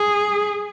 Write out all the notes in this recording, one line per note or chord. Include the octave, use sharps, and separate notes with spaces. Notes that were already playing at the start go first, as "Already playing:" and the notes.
Already playing: G#4